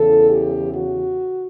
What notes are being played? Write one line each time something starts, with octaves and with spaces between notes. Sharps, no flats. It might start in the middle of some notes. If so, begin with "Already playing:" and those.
Already playing: E2 C#3 E3 A4
G4
F#4